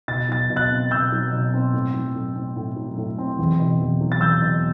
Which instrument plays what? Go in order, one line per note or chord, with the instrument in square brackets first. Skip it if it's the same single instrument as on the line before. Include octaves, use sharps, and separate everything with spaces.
[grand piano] B2 A6
F#3 A6
B2
F#6 A6
C4
B2 E6 G6
F#3
B2
C4
A2
F#3
A2
C4
A2
F#3
A2
C4
E2
B2
E2
F#3
A6
E2 E6 G6
B2